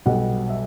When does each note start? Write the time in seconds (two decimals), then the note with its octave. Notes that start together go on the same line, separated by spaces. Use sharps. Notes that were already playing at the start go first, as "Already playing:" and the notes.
0.06 B1 B2 G3 F#5
0.50 E5